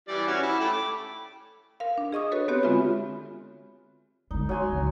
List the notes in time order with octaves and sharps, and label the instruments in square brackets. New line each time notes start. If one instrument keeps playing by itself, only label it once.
[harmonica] E3 G3 D5
C#4 F#4
E4 D6
A3 G5 B5
D6
[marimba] A#4 F5
D4
G#4 D#5 C#6 D#6
F#4 A4 B4 C#5
B3 C4 F#4 G4 C#5
D3 G#3 C4 F4 E5 B5
[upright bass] D3 G#3 [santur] D#4
[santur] F#3 G#5 C6
[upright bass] C#2